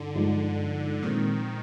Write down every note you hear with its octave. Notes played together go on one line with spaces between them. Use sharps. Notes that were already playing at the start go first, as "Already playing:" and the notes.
Already playing: G2 D3 D#4
G2 F3 G#3 D#4
A#2 D#3 F3 G#3 C4